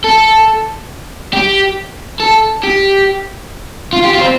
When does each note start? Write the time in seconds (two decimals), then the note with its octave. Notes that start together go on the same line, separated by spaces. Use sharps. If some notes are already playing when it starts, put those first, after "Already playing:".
0.04 A4
1.33 G4
2.20 A4
2.63 G4
3.93 F4
4.04 G4
4.14 F4
4.21 C4